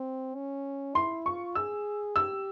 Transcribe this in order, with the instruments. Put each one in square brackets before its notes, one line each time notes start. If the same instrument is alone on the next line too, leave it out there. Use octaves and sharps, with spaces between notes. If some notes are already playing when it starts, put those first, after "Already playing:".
Already playing: [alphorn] C4
C#4
[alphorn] E4 [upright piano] C6
[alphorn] F4 [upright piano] C#6
[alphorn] G#4 [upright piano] E6
[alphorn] G4 [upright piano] E6